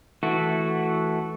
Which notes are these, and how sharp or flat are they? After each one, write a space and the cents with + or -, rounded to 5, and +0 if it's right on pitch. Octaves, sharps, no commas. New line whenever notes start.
E3 -15 A3 -10 F#4 +0